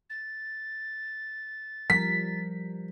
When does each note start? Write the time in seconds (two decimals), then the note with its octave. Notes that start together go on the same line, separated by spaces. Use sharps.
0.10 A6
1.90 F3 G3 A#4 B6